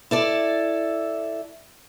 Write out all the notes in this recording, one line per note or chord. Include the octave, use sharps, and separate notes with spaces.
E4 A4 D5